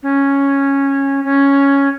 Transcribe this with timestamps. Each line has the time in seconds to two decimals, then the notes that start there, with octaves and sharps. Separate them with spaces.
0.03 C#4
1.24 C#4